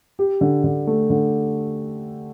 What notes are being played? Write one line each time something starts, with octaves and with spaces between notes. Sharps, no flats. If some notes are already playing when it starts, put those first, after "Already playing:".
G4
D3
D3
A3
D3